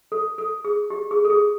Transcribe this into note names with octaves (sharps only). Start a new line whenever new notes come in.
A4
A4
G#4
G4
G#4
A4
G#4